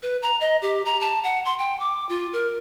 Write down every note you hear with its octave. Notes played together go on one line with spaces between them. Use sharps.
B4
A#5
D#5
G4
A#5
A5
F#5
C6
G5
D6
F4
A#4